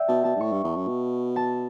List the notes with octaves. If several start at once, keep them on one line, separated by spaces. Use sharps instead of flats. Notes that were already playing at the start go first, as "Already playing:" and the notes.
Already playing: D5 E5 G5
B2 A5
B2 A5
G2
A2 C#6
G2
E2
F#2
B2
A5